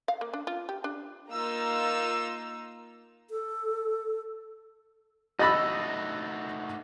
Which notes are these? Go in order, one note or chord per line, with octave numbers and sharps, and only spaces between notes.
F5
A#3
D4
F4
G4
D4
A#3 D#4 F4 A#5 E6
A4
A3 D#4 F#4 D#5 B5 E6 A6 A#6